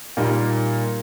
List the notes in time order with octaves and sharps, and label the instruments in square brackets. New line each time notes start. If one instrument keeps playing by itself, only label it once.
[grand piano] A#2 G3 A#3 D#4